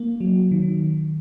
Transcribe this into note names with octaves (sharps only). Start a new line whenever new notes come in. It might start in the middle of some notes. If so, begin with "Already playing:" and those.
Already playing: A#3
F#3
D#3